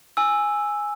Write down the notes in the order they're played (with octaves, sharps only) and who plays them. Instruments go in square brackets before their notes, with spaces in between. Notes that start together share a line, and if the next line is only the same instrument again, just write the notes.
[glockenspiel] G#5 E6